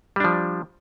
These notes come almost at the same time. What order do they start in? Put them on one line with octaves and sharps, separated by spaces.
G3 D4 F3